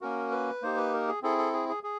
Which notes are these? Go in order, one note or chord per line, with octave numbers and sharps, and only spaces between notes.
A#3 C#4 F#4 A#4
B4
A#3 D#4 G4 C5
B4
A#4
G#4
C4 E4 G#4 A4
A4
G#4
G#4
G#4